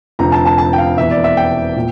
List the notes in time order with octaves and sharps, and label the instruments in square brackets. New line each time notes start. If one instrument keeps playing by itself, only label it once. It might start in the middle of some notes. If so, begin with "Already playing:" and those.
[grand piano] F1 F2 D3 A#5
A5
A5
A5
G5
F5
E1 E2 E3 E5
D5
E5
G5
A#2